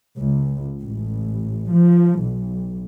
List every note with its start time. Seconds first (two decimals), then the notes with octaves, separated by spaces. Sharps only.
0.18 C#2
0.83 A1
1.70 F3
2.22 B1